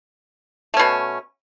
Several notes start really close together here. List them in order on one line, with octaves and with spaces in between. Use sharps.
A3 C#4 B2